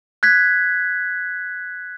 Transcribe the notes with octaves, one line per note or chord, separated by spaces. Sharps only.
F#6 G#6 B6